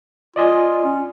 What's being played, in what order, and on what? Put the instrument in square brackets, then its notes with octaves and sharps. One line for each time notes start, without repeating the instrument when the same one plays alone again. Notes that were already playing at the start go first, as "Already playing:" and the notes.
[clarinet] F4 [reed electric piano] D5 D#5 G#5
[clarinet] C#4